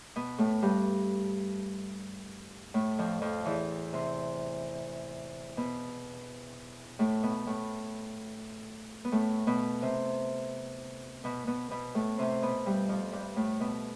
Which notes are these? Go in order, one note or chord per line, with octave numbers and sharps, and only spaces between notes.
B2 B3
A2 A3
G2 G3
A2 A3
F2 F3
F2 F3
E2 E3
C3 C4
B2 B3
A2 A3
B2 B3
A2 A3
B3
A2 A3
B2 B3
C3 C4
B2 B3
B2 B3
B2 B3
A2 A3
C3 C4
B2 B3
G2 G3
F2 F3
G2 G3
A2 A3
B2 B3